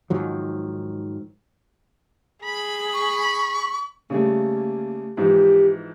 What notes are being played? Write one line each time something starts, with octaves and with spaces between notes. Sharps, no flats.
G#2 D#3 F3 F#3
G#4 B5
C#6
C#3 G3 A3 A#3
G#2 E3 F3 G4